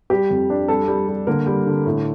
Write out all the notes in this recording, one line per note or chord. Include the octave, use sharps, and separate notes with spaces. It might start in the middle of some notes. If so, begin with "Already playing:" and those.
G3 G4
F2
D4
G3 A4
G3
G3
D3 A#3 A#4
G3
D3
A2